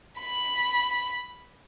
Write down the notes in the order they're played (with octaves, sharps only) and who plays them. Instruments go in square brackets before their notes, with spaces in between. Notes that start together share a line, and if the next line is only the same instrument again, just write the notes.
[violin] B5